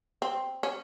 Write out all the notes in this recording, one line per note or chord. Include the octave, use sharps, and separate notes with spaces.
C4
C#4